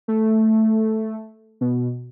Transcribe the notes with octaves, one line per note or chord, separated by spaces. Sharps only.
A3
B2